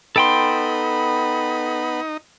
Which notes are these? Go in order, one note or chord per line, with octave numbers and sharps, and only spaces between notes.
B3 D#4 A4 G5 B5 C6